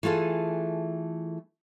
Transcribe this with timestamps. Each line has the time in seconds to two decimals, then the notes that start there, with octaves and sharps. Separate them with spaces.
0.03 E3 A3 F4 G#4 A4